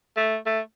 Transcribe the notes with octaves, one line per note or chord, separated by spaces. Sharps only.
A3
A3